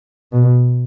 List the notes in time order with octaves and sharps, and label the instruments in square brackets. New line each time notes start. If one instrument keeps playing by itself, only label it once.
[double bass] B2